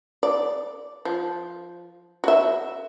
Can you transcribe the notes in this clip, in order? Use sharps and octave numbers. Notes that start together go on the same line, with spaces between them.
D5
F3
F#4 E5